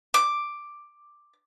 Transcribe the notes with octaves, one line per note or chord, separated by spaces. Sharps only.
D6